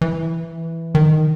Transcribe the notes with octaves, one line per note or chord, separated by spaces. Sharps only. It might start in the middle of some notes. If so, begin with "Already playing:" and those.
E3
D#3